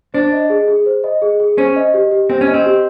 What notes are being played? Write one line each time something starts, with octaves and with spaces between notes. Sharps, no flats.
D4 C5
D#5
G#4
G#4
C5
D#5
G#4
G#4
C#4 C5
D#5
G4
G4
C4 C5
C#4
D#5
C4
G4